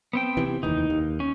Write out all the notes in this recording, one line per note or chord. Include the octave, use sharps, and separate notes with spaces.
B3 C4 G5
C3 E3
F1 D#2 E3 D#4
D#2
C#4